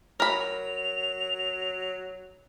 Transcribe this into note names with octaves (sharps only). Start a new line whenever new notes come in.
F#3 A#4 B5 F7